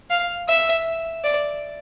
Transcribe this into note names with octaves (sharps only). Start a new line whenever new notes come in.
F5
E5
D5